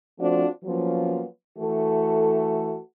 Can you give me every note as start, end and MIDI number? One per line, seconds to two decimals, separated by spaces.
0.19 0.46 53
0.19 0.46 57
0.19 0.46 60
0.19 0.46 62
0.19 0.46 65
0.19 0.46 66
0.65 1.23 53
0.65 1.23 54
0.65 1.23 58
0.65 1.23 59
0.65 1.23 61
0.65 1.23 65
1.58 2.79 52
1.58 2.79 57
1.58 2.79 66
1.58 2.79 69